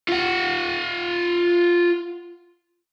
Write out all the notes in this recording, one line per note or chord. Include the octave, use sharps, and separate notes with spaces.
F4 F#5